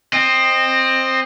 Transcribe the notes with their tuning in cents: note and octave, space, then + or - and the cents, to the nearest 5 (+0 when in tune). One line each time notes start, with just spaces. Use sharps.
C4 +10 D#5 -15